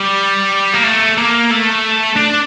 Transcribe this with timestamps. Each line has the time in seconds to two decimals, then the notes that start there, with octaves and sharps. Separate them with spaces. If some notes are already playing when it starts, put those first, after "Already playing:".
Already playing: G3
0.73 A#3
0.84 A3
1.18 A#3
1.51 A3
2.17 D4